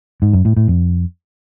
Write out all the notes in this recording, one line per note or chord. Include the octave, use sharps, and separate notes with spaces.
G#2
F#2
A2
A2
F2